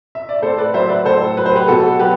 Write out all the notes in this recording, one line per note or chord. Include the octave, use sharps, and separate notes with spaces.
E5
D5
A2 A4 C5
B4 D5
F#3 C5 E5
B4 D5
A2 A4 C5
F#3 B4
C5
G4 B4
B2 F#4 A4
F#3 G4 B4